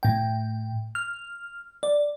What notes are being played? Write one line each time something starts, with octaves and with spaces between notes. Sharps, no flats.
A2 G5
F6
D5